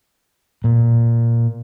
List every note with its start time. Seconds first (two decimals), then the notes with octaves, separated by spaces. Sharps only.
0.64 A#2